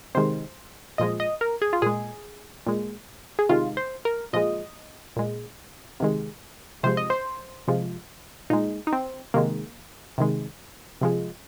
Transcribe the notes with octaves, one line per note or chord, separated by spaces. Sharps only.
C3 D#3 G#3 C5
A#2 F3 G#3 D#5
D#5
A#4
G#4
F4
A#2 G#3 G#4
A#2 G#3
G#4
C3 D#3 G#3 F4
C5
A#4
A#2 F3 G#3 D#5
A#2 G#3
C3 D#3 G#3
C3 F3 G#3 C5
D#5
C5
C3 F3 G#3
A#2 G#3 D#4
D#4
C4
C3 D#3 G#3 A#3
C3 D#3 G#3
C3 F3 G#3